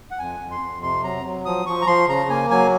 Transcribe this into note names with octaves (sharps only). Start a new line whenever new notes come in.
F#5
F2 G#5
F2
C6
F2
C3 C6
F#3 A#5
F#3
F3 D#6
F3 C#6
A#5
F3 C6
C#3 A#5
A#3 G#5
F#3 G#5